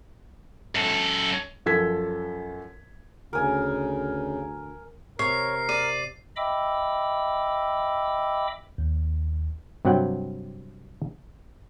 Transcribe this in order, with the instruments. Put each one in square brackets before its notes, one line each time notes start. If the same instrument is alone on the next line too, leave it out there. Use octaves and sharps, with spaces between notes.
[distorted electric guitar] F#2 A4
[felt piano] F#2 F3 A4 G#6 B6
[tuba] D2 [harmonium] C#3 [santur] A#4 G#5
[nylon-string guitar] C3 [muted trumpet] A#4 [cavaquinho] C#5 [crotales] C7
[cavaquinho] D5 [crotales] D#7
[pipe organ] D#5 E5 G5 B5 D6 E6
[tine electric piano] D#2
[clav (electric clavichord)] G2 C3 F#3 F#5 G5